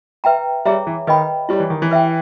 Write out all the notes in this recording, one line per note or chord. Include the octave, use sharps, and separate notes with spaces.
B4 E5 G5 A#5
G3 G#4 C#5 E5 A#5
E3
D#3 B4 D#5 G5 B5
G3 E4 G4 C#5
E3
D#3
E3
B4 E5 G5